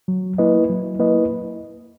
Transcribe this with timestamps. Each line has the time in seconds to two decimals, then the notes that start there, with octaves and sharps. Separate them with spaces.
0.08 F#3
0.38 A#3 E4 B4 D#5
0.69 F#3
1.00 A#3 E4 B4 D#5